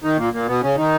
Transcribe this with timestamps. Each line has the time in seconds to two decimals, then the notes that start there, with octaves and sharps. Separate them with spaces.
0.04 D#3 D#4
0.19 A#2 A#3
0.34 A#2 A#3
0.48 B2 B3
0.63 C#3 C#4
0.77 D#3 D#4